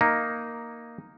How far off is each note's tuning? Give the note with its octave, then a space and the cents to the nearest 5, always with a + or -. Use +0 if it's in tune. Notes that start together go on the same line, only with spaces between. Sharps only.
A#3 +0 D#4 +0